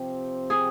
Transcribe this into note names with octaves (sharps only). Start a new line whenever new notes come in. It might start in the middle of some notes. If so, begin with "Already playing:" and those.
Already playing: C3 F3 C4 G4
G#4